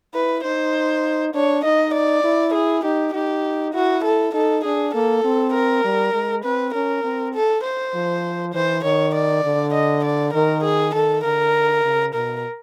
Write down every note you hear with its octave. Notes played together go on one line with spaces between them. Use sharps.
E4 B4
D#4 C5
D4 C#5
D#4 D#5
D5
E4
G#4
D#4 G4
D#4 G4
E4 F#4
A4
D#4 A4
D4 G#4
A#3 A4
C4
A#4
G3
G#3
C4 B4
C#4 A#4
C4
A4
C5
F3
E3 C5
D#3 C#5
D5
D3
D#5
D5
D#3 A#4
G#4
D#3 A4
D3 A#4
C#3
B2 A#4